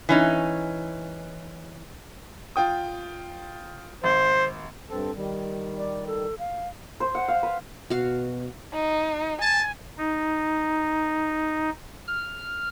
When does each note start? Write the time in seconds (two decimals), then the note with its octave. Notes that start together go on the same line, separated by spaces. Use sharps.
0.09 E3 C#4 D#4
2.56 F4 G5 D#6
4.04 G#1 C5
4.90 G2 C4 A4
5.16 D#3 G3
5.77 D5
6.07 A4
6.39 F5
7.00 C5
7.15 F#5
7.28 F5
7.43 B4
7.90 B2 F#4 F5
8.74 D#4
9.42 G#5 A5
9.98 D#4
12.07 F6